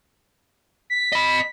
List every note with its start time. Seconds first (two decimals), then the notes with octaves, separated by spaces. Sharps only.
0.90 B6
1.12 D#5 B5